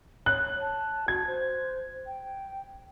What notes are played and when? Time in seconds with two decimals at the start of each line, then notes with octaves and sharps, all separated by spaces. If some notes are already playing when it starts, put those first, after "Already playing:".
0.26 C#5 F#6
0.60 A5
1.08 F#4 G#6
1.27 C5
2.07 G5